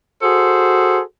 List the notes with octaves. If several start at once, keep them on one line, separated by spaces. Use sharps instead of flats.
F#4 G#4 A4 C5